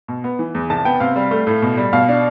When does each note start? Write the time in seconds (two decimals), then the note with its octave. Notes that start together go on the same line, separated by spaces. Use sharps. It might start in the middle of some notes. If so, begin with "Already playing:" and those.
0.08 B2
0.24 B3
0.39 E3
0.55 E2
0.70 C2 A5
0.85 B3 G5
1.00 C3 F5
1.16 G3
1.31 A3
1.47 A2
1.62 B2
1.78 G3
1.93 B2 F5
2.09 D4